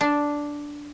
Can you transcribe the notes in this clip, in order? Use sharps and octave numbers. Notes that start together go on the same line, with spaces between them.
D4